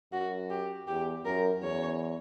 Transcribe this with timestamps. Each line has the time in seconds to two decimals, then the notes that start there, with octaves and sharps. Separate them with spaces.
0.12 F#2 F#4
0.50 G4
0.88 E2 G4
1.25 F#2 A#4
1.62 E2 C#5